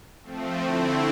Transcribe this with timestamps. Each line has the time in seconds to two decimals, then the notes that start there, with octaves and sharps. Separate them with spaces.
0.23 F3 A3 C4
0.62 D3 A3 C4 E4